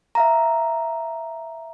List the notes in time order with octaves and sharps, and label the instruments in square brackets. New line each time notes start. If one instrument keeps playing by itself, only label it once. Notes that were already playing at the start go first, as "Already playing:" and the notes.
[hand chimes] E5 F5 A#5